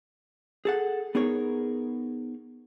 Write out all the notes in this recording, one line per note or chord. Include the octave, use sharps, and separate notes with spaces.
G#4 A4 F#5
B3 D#4 G#4 A#4 C#5